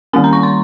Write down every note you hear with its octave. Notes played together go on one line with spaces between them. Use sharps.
D#3 G3 A#3 C#4 G#5
A#5
C#6
C6